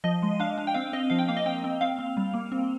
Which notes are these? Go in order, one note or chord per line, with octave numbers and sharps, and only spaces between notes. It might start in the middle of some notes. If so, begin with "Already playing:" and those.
F3 D#5
G#3
D4 F5
D4
G5
C4 F5
C4 D#5
F3 F5
G5
A#3 F5
D#5
C4 G5
C4
C4 F5
C4
G3
A#3
C4